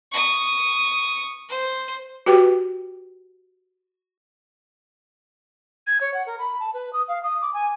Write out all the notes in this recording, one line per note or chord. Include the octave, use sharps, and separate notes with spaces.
C#6 D#6
C5
F#4 G4 B4 G5
G#6
C#5
F#5
A#4
B5
A5
B4
D#6
F5
D#6
D6
G#5